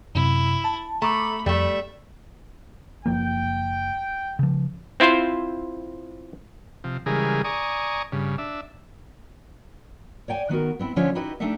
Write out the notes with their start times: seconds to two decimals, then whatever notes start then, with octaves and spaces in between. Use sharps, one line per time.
0.15 F#2 C3 E4
0.64 A5
1.02 A3 A#5 B5 D6
1.46 F2 G3 A3 E5
3.06 F#1 F3 A#3 G5
4.39 C#3 F3
5.00 C4 E4 F4 C5
6.84 C3 F3
7.06 C#3 E3 G3 G#3 G#4 A#4
7.44 D5 G#5 A#5 C#6 D#6
8.12 G2 C#3
8.38 D4 E5
10.28 C#5 D5 G5 G#5
10.49 D#3 B3 F#4 A#4
10.79 B3 C4 E4
10.96 D3 F3 C#4 F4 C#5 E5
11.15 D#4 E4 F#4 G4 B4 D#5
11.40 A3 D4 D#4 G4 A4 E5